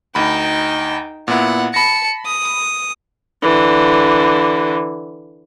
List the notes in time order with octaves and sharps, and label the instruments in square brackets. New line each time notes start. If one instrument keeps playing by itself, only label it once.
[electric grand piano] D2 B5 [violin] D#4 G5
[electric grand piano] A#2 B3 E4 [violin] F#5
[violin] A5 C#7 [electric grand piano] B5 A#6
[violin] D#6
[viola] D3 E3